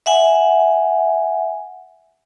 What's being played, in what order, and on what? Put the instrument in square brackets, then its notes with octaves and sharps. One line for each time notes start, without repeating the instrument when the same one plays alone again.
[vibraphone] E5 F#5 G#5